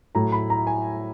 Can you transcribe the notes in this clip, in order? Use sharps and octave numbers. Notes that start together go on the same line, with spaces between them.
A2 F#3 A3 A#5
B5
A#5
G#5